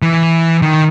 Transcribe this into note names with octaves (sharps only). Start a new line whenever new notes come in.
E3
D#3